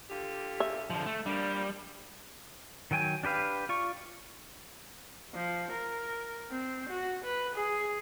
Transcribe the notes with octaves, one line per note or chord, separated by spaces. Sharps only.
D3 F4 G4
E5
D3 F3
A3
F3 G3 A#3 D4
D#3 F#3 G5 G#5
D4 G4 B4 F5
F4 D5 C#6
F3
A#4
C4
F#4
B4
G#4